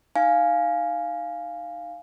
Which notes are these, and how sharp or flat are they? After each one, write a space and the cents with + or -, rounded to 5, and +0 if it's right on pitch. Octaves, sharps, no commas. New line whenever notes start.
D#4 +0 F5 +0 G#5 +0